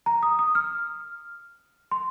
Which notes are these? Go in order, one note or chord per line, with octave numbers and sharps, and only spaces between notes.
A#5
D#6
D#6
F6
C6